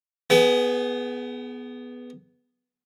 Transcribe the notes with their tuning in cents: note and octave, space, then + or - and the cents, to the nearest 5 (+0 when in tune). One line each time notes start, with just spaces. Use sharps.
B3 +0 G#4 +15 F#5 +45